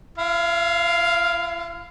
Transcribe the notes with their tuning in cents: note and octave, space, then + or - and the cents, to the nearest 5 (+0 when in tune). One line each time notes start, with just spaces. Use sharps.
E4 +45 F5 +0